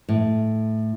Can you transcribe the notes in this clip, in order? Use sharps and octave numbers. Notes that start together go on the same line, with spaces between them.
A2